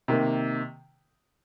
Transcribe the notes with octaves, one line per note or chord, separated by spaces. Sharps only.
C3 D#3 A#3